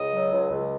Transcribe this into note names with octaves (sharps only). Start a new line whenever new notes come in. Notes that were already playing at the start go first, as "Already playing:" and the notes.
Already playing: C#2 D#5
F#3
C#2
C#2